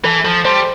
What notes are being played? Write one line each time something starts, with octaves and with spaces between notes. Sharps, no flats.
E3 A4
F3 A4
G3 C5